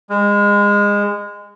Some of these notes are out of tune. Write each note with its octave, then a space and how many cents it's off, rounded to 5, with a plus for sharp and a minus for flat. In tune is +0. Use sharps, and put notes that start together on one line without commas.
G#3 -25